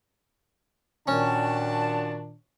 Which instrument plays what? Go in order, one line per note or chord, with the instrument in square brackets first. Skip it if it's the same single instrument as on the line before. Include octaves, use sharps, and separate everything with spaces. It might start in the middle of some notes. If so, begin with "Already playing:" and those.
[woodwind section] A#2 D#3 [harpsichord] C#4 [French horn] D4 [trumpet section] F#4 A5